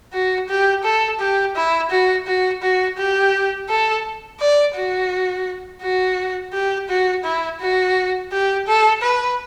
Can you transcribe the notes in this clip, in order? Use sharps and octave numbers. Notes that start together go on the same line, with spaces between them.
F#4
G4
A4
G4
E4
F#4
F#4
F#4
G4
A4
D5
F#4
F#4
G4
F#4
E4
F#4
G4
A4
B4